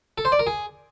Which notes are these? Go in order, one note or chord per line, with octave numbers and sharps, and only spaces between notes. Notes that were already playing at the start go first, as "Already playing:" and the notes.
A4
C5
D5
A#4
G#4